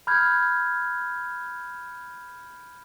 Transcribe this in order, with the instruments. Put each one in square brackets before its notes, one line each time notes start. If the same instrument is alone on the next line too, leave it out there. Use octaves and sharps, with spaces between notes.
[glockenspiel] B5 F6 G6 G#6